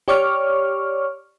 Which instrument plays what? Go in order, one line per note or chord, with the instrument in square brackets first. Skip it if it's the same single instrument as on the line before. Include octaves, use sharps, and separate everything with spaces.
[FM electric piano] G4 C#5 D5 C#6 D6 F6